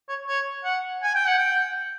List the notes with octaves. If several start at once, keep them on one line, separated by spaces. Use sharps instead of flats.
C#5
C#5
F#5
G#5
G5
F#5
G5